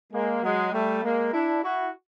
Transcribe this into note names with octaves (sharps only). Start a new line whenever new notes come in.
G#3 A#3
F#3 G#3
G3 A3
G#3 A#3
D4 E4
E4 F#4